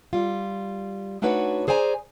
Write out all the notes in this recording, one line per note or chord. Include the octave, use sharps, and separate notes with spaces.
G3 F4
A3 D4 D#4 F#4 B4 C#5
G#4 C5 D5 G#5 A#5